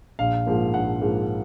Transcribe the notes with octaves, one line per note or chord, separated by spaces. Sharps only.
A#1 F5
G#2 F3 A#3
A#1 F#5
G#2 F3 A#3